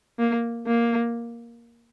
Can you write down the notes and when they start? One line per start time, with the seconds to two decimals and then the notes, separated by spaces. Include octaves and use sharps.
0.19 A#3
0.67 A#3